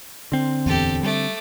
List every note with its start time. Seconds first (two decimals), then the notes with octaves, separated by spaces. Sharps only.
0.32 D3 C4
0.66 D1 E2 G4 A4
1.03 G3 A3 D6